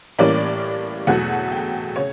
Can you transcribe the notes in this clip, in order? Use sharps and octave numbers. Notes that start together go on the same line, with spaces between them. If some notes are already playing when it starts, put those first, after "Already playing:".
A2 E3 G3 A#3 C#4 D5
E2 B2 F#3 A3 F#5
G5
C#3 C#5